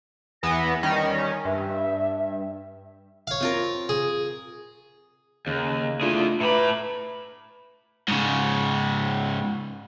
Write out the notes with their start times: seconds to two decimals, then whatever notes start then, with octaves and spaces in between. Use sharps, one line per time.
0.43 E2 E3 B3 A#6
0.83 D#3 G3 C#4
1.45 G2 E5
3.27 C#5 F5
3.41 C4 F4 A#4
3.89 G#4
5.46 D#2 C#3
6.01 A3 D4 E4 F4 G#4
6.41 A2 B4 E5 A#5 B5 D6
8.08 G#2 C#3